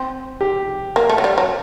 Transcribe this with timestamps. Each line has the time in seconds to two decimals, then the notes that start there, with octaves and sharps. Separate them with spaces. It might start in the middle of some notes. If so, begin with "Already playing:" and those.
Already playing: C4
0.41 G4
0.96 A#3
1.09 A3
1.18 F#3
1.24 G3
1.38 F#3